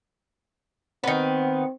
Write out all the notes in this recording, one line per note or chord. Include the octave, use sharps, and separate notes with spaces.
D#3 B3 C4